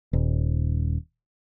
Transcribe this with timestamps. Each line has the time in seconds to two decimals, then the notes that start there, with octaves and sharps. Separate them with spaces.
0.13 D#1